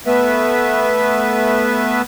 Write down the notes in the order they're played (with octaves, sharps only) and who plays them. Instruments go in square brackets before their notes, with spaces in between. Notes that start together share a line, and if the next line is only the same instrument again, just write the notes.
[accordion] A3 B3 B4 E5